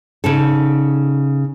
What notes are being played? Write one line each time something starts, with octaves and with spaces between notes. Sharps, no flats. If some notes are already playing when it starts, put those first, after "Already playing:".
C#3 D#4 A4